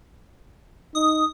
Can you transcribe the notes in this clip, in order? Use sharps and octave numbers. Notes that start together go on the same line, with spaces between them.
D#4 D#6